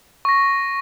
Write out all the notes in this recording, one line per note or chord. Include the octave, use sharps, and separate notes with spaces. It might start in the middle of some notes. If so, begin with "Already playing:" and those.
C#6 A#6